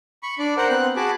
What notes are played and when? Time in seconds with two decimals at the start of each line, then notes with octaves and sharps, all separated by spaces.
0.23 B5 C#6
0.39 D4 D5
0.57 A#4 C5 F#5
0.69 B3 C4 F#6
0.96 F#4 G#4 A5 B5 D6